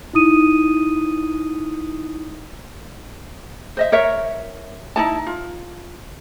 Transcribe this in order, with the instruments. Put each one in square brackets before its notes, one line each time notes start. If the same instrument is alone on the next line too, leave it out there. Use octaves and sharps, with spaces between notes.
[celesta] D#4 E4 D#6 D#7
[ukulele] C5 D#5 E5
A#4 C#5 E5
D#4 E4 A5
F4